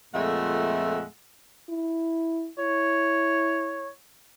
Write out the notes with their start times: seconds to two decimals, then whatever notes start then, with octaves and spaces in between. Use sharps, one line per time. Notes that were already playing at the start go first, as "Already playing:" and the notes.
0.14 F2 A#2 G#3 A3 E5 F#5
1.69 E4
2.59 E4 C#5